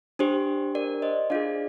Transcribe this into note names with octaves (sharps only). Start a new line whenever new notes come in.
D4 G4 C5
A#4 D5
C5 D#5
D4 F4 G#4 D5 F5